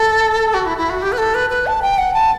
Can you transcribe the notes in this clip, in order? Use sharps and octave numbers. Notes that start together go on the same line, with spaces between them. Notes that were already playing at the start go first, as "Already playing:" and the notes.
Already playing: A4
F#4
E4
E4
F#4
G4
B4
A4
B4
B4
A5
G5
F#5
A5